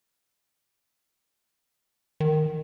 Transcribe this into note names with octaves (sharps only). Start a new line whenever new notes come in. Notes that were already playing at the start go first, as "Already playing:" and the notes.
D#3